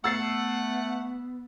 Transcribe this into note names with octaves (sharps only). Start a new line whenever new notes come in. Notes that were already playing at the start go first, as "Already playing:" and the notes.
A3 B3 F#5 E6 A6 C7